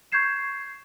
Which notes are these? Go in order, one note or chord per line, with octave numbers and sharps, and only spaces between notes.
C#6 G6 G#6 C7 E7